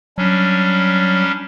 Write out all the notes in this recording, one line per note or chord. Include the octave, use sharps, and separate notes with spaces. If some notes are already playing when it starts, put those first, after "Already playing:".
F#3 G3 C#4 D4